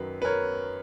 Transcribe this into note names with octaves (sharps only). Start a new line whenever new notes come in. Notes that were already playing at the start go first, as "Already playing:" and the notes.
Already playing: F#2 D#3 F#3 B4
B4
A#4 C#5